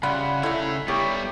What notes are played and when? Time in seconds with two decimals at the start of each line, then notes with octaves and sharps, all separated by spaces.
0.03 C#3 G3 E4 F4 F#5 B5
0.43 C#3 A3 D#4 E4 C#5 E5
0.88 G3 B3 G4 A#4 C#5